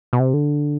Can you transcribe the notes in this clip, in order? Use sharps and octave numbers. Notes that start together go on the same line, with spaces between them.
B2
C3
D3